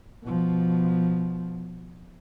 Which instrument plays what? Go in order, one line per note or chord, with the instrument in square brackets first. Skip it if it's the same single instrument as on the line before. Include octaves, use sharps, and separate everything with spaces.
[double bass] B2 F3